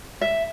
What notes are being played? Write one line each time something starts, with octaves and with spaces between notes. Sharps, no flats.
E5